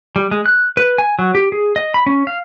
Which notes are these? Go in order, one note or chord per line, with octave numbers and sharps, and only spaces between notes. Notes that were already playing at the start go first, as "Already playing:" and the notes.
G3
G#3
F#6
B4
G#5
F#3
G4
G#4
D#5
B5
C#4
F5